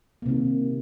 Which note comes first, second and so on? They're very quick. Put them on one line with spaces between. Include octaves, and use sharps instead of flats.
A#3 C3 D#3